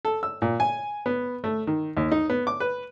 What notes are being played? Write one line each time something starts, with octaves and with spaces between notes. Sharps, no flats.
A4
E6
A#2
G#5
B3
A3
D#3
D#2
D#4
B3
D6
B4